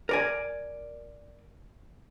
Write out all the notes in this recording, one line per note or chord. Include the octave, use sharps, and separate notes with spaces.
A#4 D5 G#5